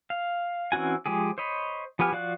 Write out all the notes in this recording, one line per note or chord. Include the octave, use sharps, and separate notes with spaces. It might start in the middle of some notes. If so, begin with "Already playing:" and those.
F5
E3 C4 C#4 F#4 G#5
F3 G#3 G4 G#4
C5 C#5 D#5 B5
F3 B3 G4 G#5 F6
F3 F#4 D5 F5 F#6